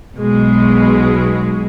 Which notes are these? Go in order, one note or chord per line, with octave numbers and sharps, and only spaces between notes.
B1 B2 G#3